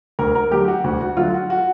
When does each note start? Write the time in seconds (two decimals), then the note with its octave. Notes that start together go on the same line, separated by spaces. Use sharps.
0.19 D2 A#4
0.35 A#4
0.51 D3 F#3 A3 G4
0.68 F#4
0.84 D2 F#4
1.01 F#4
1.17 D3 F#3 A3 F4
1.34 F#4
1.50 F#4